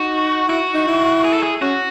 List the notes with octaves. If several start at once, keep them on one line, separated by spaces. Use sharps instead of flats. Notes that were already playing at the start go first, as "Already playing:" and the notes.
Already playing: D#4 F#4
E4 F#4
D#4
E4
G#4
A4
G#4
C#4 F#4